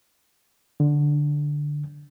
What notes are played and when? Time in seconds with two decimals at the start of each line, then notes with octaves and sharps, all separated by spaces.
0.80 D3